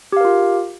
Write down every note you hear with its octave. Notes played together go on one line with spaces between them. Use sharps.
F4 G4 A#4 F5